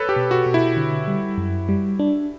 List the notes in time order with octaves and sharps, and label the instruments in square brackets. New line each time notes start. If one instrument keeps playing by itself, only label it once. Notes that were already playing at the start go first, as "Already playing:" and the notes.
Already playing: [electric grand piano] A4 B4 C#5
G4
[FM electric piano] B2
[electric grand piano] F#4
[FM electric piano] B2
[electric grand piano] E4
[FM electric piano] D3
G3
F#2
G3
D4